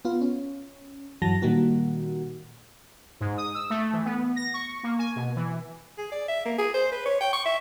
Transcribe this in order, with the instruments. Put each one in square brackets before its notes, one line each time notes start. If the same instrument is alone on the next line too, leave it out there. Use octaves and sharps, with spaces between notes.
[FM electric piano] B3 F4
C#4
G2 E3 F#3 A5 A#6
A#2 D#3 G3 A#3 F#4
[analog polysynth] G#2
D#6
E6
A3
E3
B3
A#6
C#6
A#3
G#5
B2
E3
[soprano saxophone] G#4
D5
E5
A#3
G#4
C5
B4
C#5
G5
C#6
E5